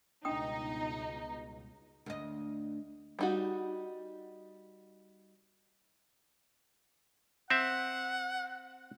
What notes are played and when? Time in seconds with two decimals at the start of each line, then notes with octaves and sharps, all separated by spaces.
0.25 G1 C#2 B2 D4 D#4 G5 D#6
2.06 D2 D#5
3.19 G3 D#4 F#4
7.50 C4 E5 F#5